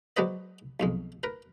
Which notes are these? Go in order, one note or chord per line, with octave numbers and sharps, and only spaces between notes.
F#3 G#3 D4 B4 C5 D#5
B1 F2 G#3
A#4 B4